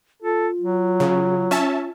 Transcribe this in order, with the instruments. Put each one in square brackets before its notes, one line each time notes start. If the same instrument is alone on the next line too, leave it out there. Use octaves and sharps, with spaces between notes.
[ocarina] F4 [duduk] A4
[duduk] F#3
[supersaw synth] C#3
C#4 E5 A5